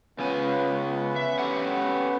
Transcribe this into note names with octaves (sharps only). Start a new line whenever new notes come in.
C#3 B3 C#4 F4 B4 G#5
E5
G4 A4 F#5